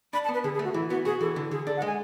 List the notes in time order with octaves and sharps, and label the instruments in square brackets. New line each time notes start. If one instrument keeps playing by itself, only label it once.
[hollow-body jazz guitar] D4 [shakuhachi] B5
[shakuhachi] A5
[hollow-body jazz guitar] B3
[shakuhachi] B4
[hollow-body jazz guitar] D3 [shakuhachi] G#4
[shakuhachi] G#4
[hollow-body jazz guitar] A3
[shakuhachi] F#4
[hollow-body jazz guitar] E3 [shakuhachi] E4
[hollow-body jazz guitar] B3 [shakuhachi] F#4
[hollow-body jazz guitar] F#4 [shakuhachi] G#4
[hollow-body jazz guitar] E3 [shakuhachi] A4
[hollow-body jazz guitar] D3
[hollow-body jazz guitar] D3 [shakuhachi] G#4
[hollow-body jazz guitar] D4 [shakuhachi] A4
[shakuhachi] F#5
[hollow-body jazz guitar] G#3 [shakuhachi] G#5